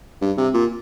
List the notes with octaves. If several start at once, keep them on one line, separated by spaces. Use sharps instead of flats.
G2
C3
A#2